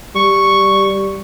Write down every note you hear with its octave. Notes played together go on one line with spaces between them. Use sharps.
G3 C#6